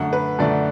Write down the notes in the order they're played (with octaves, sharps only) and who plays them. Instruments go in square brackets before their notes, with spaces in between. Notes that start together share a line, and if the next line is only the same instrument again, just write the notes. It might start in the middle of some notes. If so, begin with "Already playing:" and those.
Already playing: [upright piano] F#2 D3 A3 [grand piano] F#5
[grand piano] B4
[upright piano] F#2 D3 A3 [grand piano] D5